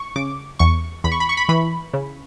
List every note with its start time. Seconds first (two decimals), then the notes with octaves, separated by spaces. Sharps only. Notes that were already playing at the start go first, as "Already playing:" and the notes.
Already playing: C#6
0.16 C#3 D6
0.59 E2 C#6
1.04 E2 B5
1.12 C#6
1.20 B5
1.29 C#6
1.37 B5
1.49 E3 B5
1.93 C#3